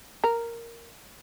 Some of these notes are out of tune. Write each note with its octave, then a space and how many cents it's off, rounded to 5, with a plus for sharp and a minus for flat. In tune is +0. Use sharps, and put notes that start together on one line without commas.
A#4 -5